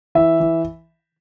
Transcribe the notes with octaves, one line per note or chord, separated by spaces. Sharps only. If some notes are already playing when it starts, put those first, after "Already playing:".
E3 E5
E3